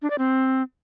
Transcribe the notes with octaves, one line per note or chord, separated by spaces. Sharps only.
D4
D5
C4